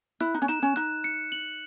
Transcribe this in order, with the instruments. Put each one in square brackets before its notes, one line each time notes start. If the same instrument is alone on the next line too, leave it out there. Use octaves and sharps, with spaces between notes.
[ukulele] E4 [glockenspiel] F#6
[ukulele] D#4
C#4
[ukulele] D#4 [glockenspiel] E7
[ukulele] C#4
[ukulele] D#4 [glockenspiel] F#6
[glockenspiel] C#7
F#7